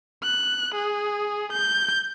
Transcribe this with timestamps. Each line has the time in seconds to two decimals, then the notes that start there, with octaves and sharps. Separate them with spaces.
0.23 F#6
0.75 G#4
1.52 G6